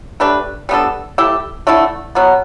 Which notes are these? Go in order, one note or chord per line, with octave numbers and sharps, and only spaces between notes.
A3 D4 G4 B4
G3 B3 D4 A4
A3 E4 G4
D3 A3 E4
B2 F#3 B3